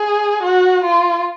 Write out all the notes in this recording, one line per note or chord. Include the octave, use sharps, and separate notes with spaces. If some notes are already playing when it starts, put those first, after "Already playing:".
Already playing: G#4
F#4
F4